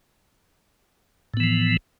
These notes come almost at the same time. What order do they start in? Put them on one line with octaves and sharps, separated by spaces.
A2 B3 E3 F3